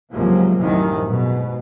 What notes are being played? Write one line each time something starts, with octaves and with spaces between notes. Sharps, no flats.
C#2 G#2 C3 F3 F#3 A#3
C2 F#2 A2 D#3 F3
G#2 B2